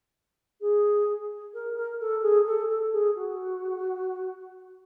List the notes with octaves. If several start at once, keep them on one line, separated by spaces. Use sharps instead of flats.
G#4
A#4
A#4
A4
G#4
A4
A4
G#4
F#4